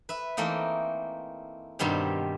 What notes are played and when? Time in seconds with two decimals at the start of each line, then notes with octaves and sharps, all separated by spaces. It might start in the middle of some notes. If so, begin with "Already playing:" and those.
0.09 B4 E5
0.37 E3 A3 A#3 C4 D#4
1.79 G2 B2 D#3 G3 C4 G4